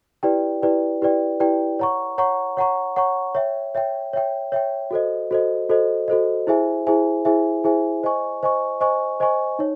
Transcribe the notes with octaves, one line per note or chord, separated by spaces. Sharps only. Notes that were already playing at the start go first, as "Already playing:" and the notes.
E4 G4 B4 D5 G5
E4 G4 B4 D5 G5
E4 G4 B4 D5 G5
E4 G4 B4 D5 G5
C#5 F#5 A#5 C#6
C#5 F#5 A#5 C#6
C#5 F#5 A#5 C#6
C#5 F#5 A#5 C#6
C#5 E5 G5
C#5 E5 G5
C#5 E5 G5
C#5 E5 G5
F#4 A4 C5 D#5
F#4 A4 C5 D#5
F#4 A4 C5 D#5
F#4 A4 C5 D#5
E4 G#4 C5 E5 G#5
E4 G#4 C5 E5 G#5
E4 G#4 C5 E5 G#5
E4 G#4 C5 E5 G#5
C5 D#5 G#5 C#6
C5 D#5 G#5 C#6
C5 D#5 G#5 C#6
C5 D#5 G#5 C#6
D#4 C#5